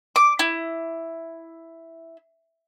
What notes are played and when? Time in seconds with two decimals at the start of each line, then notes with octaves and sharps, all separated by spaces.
0.16 D6
0.39 E4